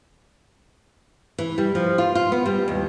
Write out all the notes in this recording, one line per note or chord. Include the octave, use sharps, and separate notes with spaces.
E3
G3
F3
F4
F4
B3
G3
D#2